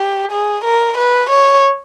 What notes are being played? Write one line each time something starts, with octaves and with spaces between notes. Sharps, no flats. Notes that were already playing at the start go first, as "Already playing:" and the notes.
Already playing: G4
G#4
A#4
B4
C#5